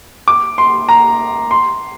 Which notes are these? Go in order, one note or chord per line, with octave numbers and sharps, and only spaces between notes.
D6
C6
A#5
C6